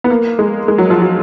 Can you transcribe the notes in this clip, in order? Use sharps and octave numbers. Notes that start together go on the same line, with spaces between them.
B3
A#3
G#3
G#3
F#3
F3
F#3